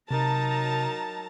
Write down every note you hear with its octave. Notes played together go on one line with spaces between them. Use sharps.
C3 F#3 D#4 A#4 A5 A#5